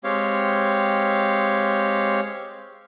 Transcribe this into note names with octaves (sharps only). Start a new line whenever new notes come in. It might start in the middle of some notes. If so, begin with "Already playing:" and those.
G#3 C4 G4 C#5 F5